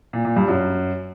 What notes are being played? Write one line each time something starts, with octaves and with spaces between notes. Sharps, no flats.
A#2
A#2
G2
F#2